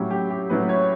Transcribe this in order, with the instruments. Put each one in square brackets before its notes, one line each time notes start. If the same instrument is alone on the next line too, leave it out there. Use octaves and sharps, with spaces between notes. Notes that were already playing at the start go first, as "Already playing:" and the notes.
Already playing: [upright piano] A2 F#3 C#4 E4 G4
G4
G4
A2 F#3 C#4 E4 B4
C#5